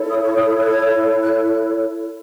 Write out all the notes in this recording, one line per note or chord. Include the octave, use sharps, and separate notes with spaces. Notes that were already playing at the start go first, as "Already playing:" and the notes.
Already playing: E4 A4 C#5
D#6
C#6
D#6
F#6
G#6
F#6